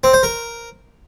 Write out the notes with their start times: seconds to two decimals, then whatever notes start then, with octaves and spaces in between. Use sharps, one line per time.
0.04 C4
0.13 C5
0.23 A#4